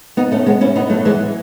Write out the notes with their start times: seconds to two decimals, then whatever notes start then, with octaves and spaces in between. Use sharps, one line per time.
0.17 B3 D#4
0.32 A3 C#4
0.46 G#3 B3
0.61 C#4 E4
0.76 B3 D#4
0.90 F#3 A3
1.05 E3 G#3